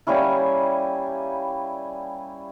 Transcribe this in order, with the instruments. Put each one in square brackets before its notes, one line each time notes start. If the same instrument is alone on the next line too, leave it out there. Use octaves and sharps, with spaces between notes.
[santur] G3 A#3 C#4 E4